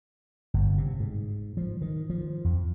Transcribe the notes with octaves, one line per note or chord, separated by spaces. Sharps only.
G1
C3
G#2
F3
D#3
F3
F2